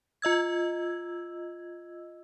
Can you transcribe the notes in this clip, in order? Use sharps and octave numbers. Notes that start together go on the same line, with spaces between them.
F4 D#5 E6 G#6